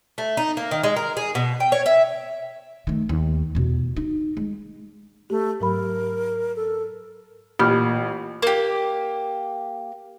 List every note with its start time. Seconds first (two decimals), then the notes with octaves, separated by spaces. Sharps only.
0.18 A3
0.37 D#4
0.57 A#3
0.71 D#3
0.84 G#3
0.96 A#4
1.17 G#4
1.35 B2
1.60 G5
1.72 C#5
1.86 E5
2.87 D#3 A3
3.09 D#2
3.55 E2 B2
3.96 D#4
4.37 G#3
5.30 A3 G4
5.60 G#2 F#3 A#4 B5
6.56 A4
7.59 A1 A#2 G4 B5 F6
8.42 A#3 G4